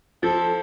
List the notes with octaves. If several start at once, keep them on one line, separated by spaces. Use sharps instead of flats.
F3 A4